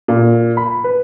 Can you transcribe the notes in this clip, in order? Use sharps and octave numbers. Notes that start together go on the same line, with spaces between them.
A#2
B5
B4